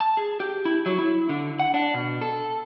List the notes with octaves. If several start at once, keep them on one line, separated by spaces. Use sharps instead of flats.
A5
G#4
G4
E4
F#3
E4
D3
F#5
D4
B2
A4